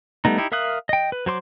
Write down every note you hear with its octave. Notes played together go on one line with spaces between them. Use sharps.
G3 A3 B3 D#4
D#4 E4 G4
A#4 E5 F5 D#6 F#6
D#5 G5
B4
F#3 C5 C6 D6